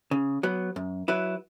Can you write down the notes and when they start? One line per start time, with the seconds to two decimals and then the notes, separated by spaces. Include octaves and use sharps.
0.11 C#3
0.43 F#3 B3
0.76 F#2
1.08 F#3 E4 B4